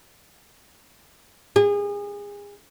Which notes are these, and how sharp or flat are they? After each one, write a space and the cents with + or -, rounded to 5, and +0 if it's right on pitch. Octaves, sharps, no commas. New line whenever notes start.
G#4 -30